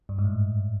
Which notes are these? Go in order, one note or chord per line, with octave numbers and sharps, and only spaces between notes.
G2
G#2
A2